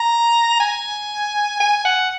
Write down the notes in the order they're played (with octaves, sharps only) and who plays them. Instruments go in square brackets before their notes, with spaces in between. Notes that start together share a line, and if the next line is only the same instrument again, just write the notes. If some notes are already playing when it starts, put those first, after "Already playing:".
Already playing: [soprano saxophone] A#5
G#5
G#5
F#5